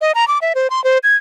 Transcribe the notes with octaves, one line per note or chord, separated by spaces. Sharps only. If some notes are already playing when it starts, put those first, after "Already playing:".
D#5
A#5
D6
E5
C5
C6
C5
G#6